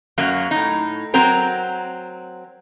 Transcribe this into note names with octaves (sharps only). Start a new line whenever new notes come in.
F#2 F#3 A#3
A2 D#4
F#3 C4 A#4